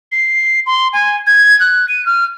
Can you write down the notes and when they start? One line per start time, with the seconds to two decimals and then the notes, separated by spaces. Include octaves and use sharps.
0.12 C7
0.66 C6
0.93 G#5
1.27 G#6
1.60 F#6
1.88 D#7
2.06 F6